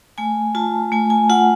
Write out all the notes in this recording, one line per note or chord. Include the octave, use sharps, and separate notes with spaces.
A3 G#5
F4 A5
A3 G#5
G#5
F4 F#5